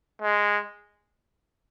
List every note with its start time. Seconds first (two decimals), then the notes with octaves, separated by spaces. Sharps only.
0.22 G#3